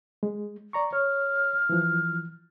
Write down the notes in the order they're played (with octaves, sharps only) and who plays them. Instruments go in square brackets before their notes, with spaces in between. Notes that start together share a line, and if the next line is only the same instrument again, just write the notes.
[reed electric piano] G#3
D5 A#5 C#6
[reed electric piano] C#5 [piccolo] F6
[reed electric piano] E3 F3